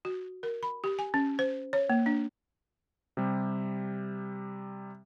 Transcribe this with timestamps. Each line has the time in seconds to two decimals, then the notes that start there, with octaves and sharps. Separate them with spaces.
0.05 F#4
0.43 A#4
0.63 B5
0.84 G4
0.99 G#5
1.14 C#4
1.39 C5
1.73 C#5
1.89 A#3
2.06 D4
3.17 C3 G3